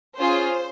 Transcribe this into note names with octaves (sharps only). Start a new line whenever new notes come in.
C#4 F4 G#4 C5